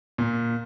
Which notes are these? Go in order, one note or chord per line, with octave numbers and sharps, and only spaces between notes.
A#2